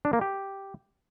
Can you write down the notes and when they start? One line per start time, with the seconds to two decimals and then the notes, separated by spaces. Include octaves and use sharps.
0.05 D4
0.13 A#3
0.21 G4